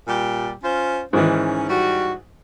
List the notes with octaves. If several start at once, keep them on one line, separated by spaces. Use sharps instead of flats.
A#2 G3 G4
C#4 F4 C5
G#2 D#3 E3 C#4
G3 F#4